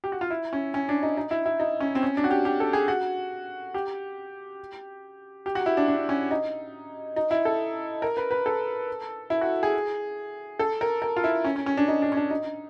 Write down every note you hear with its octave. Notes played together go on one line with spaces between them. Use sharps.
G4
F#4
F4
E4
C#4
C#4
D4
D#4
D#4
E4
E4
D#4
C#4
C4
C#4
D4
F#4
G4
G4
A4
G#4
F#4
G4
G4
F#4
E4
D4
D4
C#4
D#4
D#4
E4
A4
A#4
B4
B4
A4
E4
F#4
G#4
A4
A#4
A#4
F4
E4
C#4
C#4
C#4
D4
D#4
D4
C#4
D4
D#4